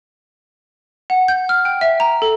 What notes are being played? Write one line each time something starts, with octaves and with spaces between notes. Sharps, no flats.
F#5
G6
F6
G5
E5
A#5
A4